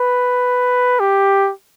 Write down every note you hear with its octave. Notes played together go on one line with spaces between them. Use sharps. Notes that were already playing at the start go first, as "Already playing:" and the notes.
Already playing: B4
G4